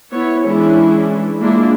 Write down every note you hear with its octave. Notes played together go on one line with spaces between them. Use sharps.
B3 E4 C#5
E3 G#3 C#4 D4 E4
G#3 A#3 D4 E4 F4 G#4